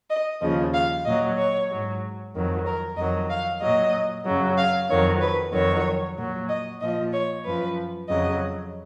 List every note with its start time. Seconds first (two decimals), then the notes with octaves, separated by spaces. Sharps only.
0.10 D#5
0.42 D#2 C#3 F3 D#5
0.74 F5
1.06 A#2 F#3 D#5
1.38 C#5
1.70 G#2 F#3
2.34 F2 D#3 F#3
2.66 A#4
2.97 F2 D#3 F#3 D#5
3.30 F5
3.62 A#2 F#3 D#5
4.26 F#2 C#3 F#3
4.58 F5
4.90 F2 D#3 F#3 C#5
5.22 B4
5.54 F2 D#3 F#3 C#5
6.18 A#2 F#3
6.49 D#5
6.82 A#2 F3 D#5
7.14 C#5
7.46 F#2 F3 B4
8.09 F2 C#3 F#3 D#5